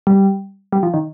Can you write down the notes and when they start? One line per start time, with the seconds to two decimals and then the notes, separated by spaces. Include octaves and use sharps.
0.07 G3
0.72 G3
0.83 F3
0.94 D#3